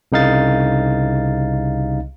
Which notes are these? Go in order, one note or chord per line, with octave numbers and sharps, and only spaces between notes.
C2 C#3 D#4 F5 A6